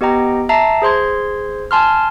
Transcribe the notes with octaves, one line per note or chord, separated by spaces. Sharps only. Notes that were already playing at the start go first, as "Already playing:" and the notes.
B3 G4 D#5 G5 A#5
E5 A5 A#5 C7
G#4 C5 C6 G#6
G#5 A5 C6 F6